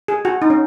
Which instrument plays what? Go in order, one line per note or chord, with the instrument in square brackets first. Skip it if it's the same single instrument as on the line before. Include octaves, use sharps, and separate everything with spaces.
[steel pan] G#4
F#4
D#4
C#4